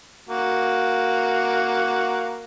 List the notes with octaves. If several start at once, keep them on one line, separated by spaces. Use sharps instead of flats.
A#3 F#4